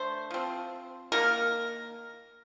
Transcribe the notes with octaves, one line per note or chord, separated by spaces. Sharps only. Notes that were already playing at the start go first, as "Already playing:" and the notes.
Already playing: D3 A3 C5
F3 C4
D#3 A#3 A#4